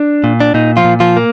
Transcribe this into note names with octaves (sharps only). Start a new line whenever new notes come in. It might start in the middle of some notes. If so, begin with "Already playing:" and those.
Already playing: D4
A#2
D4
A#2 D#4
F3 F4
A#2
F3 F4
A#3